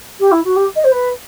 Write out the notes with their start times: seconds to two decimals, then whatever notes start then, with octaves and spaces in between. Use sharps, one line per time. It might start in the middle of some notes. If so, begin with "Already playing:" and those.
0.19 G4
0.31 E4
0.44 F#4
0.56 G4
0.76 D#5
0.84 C5
0.92 B4